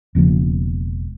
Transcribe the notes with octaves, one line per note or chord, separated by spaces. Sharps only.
E1 C#3 F3 A#3